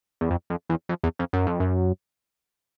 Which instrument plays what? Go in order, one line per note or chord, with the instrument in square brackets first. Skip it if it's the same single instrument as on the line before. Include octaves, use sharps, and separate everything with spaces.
[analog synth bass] E2
F2
F2
E2
F2
E2
F2
F#2
F2
F#2